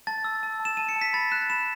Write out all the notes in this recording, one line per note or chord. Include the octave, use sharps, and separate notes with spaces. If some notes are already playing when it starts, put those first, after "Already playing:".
A5 A6
E6
A5
A5
E7
A5 D#7
C#7
A5
B6
B5 A6
F#6 E7
B5 E7